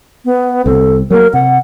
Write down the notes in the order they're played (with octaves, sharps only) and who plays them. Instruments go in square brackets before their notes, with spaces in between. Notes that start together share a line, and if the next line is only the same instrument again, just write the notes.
[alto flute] B3
[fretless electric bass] C2 C4 [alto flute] A4
[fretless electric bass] F#3 A#3 [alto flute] A#4
[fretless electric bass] C3 [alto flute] F#5